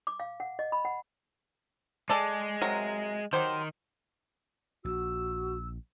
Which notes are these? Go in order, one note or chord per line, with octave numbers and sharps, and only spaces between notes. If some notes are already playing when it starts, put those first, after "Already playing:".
D6
F5
F#5
D#5
B5
F#5
G#3 G#4 A4 D5
C3 F#3 A#4
D#3 F#3 G4 C5
A#1 F#4 E6